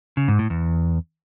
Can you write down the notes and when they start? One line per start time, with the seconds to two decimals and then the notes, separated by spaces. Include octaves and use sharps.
0.17 C#3
0.28 G#2
0.39 A2
0.50 E2